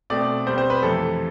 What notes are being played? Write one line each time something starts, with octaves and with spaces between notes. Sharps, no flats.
B2 A3 C4 D5
B2 G3 C4 C5
C5
B4
F2 C3 E3 A3 A4